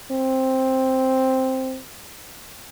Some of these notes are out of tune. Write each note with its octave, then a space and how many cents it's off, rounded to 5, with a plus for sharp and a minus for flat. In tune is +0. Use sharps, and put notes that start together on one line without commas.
C4 +5